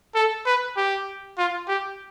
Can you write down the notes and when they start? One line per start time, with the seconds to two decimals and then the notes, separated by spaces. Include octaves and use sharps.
0.15 A4
0.46 B4
0.77 G4
1.38 F4
1.68 G4